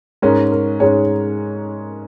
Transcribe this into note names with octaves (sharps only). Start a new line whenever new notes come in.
G#2 G#3 C#4 A#4
A#4
G#2 G#3 C#4 C#5